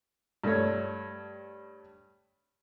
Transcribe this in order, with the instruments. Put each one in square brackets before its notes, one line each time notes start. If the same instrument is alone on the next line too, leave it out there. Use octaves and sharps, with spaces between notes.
[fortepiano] G2 A3 C#5